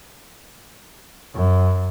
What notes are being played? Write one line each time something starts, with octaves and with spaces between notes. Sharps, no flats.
F#2